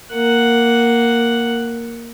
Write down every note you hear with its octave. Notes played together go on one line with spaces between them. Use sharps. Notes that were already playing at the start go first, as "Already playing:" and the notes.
A#3 F#5